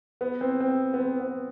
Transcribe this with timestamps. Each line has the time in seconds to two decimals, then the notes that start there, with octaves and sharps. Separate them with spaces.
0.21 B3
0.41 C4
0.60 C4
0.94 B3
1.00 C4
1.20 B3